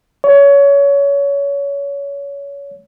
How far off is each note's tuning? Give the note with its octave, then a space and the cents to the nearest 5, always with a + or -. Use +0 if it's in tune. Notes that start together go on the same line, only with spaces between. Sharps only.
C#5 +25